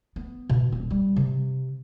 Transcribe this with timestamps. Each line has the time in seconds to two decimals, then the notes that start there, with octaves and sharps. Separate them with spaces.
0.16 B3
0.49 B2
0.72 D#1
0.91 G3
1.16 C3